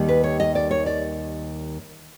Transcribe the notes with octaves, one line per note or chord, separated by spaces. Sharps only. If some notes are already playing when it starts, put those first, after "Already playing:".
Already playing: D#2 D#3 G3
B4
C#5
D#5
D5
C#5
D5